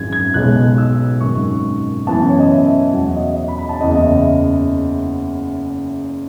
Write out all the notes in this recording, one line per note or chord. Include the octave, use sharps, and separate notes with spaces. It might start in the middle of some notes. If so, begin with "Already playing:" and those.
Already playing: G#1 F#2 E3 G#3 G#6
G#6
B1 B2 G#3 B3 F#6
E6
G#1 F#2 D#3 C#6
F#2 C#3 E3 B3 A5
C#5
D#5
E5
E2 C#3 F#3 F#5
E5
D#5
D#5
D#5
B5
B5
A5
F#1 E2 C#3 D#5
D#5
E5